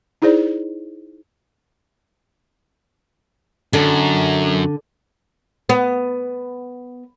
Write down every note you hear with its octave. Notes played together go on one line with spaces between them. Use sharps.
D#4 E4 G#4 C5 D5
F#2 D3
B3